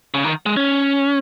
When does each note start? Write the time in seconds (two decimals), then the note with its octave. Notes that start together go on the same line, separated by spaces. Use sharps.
0.14 C#3
0.24 D#3
0.46 G#3
0.57 C#4